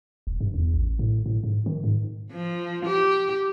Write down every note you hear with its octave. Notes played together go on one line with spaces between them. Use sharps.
D#1
G2
E2
A1
A2
A2
G#2
D#3
G#2
F3
G4